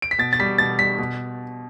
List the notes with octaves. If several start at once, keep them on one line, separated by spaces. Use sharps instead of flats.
D7
B6
B2 A6
A6
G3 B6
B2 A6
G3 B6
B2